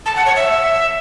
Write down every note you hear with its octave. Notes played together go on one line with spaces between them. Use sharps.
A5
F#5
C#5
E5